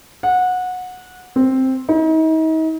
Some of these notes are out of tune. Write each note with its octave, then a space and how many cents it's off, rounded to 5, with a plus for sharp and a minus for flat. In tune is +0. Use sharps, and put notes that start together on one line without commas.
F#5 -20
C4 +5
D#4 +40